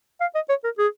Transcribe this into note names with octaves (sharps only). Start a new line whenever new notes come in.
F5
D#5
C#5
A#4
G#4